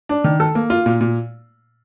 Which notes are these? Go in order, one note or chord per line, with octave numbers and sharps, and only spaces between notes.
D4
D#3
A4
A#3
F4
A#2
A#2